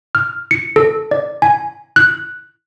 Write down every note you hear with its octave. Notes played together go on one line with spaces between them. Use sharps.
F6
C#7
A4
D5
G#5
F#6